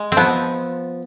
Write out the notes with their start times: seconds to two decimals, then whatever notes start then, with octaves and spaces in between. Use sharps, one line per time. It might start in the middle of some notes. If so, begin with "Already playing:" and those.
Already playing: G#3
0.12 C4
0.17 F3 B3